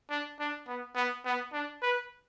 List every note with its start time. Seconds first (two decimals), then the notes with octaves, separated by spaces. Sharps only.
0.10 D4
0.39 D4
0.67 B3
0.95 B3
1.25 B3
1.53 D4
1.82 B4